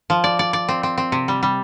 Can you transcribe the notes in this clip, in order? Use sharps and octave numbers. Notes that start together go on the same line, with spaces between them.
F3
D5
D5
D5
C4
C4
C4
C3
G3
G3